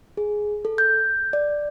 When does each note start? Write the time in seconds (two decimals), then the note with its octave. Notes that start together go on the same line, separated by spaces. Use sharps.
0.17 G#4
0.65 A4
0.78 G6
1.33 D5